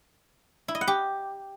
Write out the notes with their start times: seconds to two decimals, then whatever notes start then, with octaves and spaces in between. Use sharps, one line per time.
0.68 E4
0.75 D#5
0.81 F#5
0.87 G4